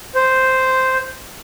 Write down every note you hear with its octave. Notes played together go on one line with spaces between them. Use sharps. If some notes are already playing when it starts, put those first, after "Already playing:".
C5